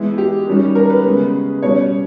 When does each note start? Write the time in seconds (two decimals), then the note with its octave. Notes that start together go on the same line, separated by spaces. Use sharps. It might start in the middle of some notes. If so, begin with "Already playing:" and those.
Already playing: E3 G#3 B3 E4
0.18 G4
0.47 D#3 G3 C#4
0.75 A#4
0.90 B4
1.05 C#3 G#3 B3
1.62 B2 G3 C#4 C#5